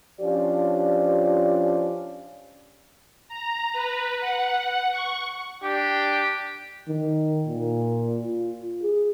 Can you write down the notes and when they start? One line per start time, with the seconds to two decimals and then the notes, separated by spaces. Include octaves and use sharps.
0.21 F3 C#4 D4 F4 G4 D5
3.28 A#5
3.73 B4
4.20 F#5
4.92 C#6
5.64 D4 G4
6.88 D#3
7.48 A#2
8.20 F4
8.83 G#4